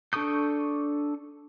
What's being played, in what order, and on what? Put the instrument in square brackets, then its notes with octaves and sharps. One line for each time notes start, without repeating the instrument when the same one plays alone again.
[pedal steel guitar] D4 A4 C#6 D#6 G6